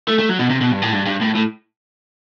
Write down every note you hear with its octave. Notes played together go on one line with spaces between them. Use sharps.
A3
A3
F#3
B2
C3
B2
G2
A2
G2
G2
A2
A2